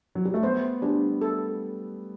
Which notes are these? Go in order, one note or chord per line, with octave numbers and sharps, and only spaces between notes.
F#3
G3
A3
B3 C5
G3 D4
A4